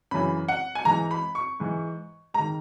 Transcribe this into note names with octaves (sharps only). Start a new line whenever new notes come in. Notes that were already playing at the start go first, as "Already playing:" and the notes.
F#2 C#3 E3 B5
F#5
G#5
G#2 E3 A#5
B5
C#6
G#2 E3
G#2 D#3 A#5